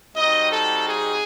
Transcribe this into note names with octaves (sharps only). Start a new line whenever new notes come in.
G3 C4 D#4 F#4 D#5
A4
G#4